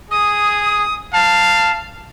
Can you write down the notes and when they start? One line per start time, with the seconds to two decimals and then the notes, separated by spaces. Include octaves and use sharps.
0.11 G#4 D#6
1.13 F5 A5